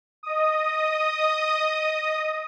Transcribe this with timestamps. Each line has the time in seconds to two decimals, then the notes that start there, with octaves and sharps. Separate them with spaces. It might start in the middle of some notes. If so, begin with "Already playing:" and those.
0.23 D#5 D#6